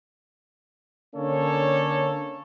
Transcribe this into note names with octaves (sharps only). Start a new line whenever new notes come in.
D3 A#3 C#4 D4 A4 C#5